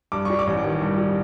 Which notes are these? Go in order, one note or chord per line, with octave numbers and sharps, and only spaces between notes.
G2 D6
G3 C#6
D6
A1
D#3
G2
G3